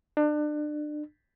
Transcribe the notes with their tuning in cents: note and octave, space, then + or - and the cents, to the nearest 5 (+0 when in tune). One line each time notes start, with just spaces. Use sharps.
D4 +30